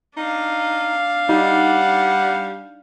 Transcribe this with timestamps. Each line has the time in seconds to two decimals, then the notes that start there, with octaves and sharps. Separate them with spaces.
0.17 D4 D#4 F5
1.29 G3 D#4 F#5